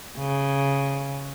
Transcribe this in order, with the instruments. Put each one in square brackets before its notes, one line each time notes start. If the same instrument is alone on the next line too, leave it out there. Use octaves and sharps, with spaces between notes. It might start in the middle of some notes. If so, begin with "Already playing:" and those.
[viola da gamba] C#3